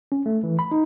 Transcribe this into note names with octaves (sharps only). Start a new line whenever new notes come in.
C#4
A3
E3
B5
D#4